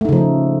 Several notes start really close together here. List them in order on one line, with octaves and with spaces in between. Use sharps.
A3 D#4 C#3 F3